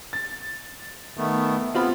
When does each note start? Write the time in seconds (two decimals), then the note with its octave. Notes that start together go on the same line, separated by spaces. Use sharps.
0.13 A6
1.18 D#3 A3 B3
1.75 B3 C4 F4 B5